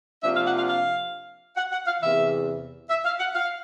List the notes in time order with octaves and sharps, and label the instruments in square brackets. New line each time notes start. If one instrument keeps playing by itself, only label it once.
[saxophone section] C3 F3 A#3 D4 F4 E5
F5
F#5
F5
F5
F#5
F#5
F5
E2 C3 E3 E5
E5
F5
F#5
F5